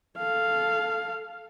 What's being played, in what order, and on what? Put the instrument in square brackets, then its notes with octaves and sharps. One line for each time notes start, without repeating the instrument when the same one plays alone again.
[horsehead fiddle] A4 F5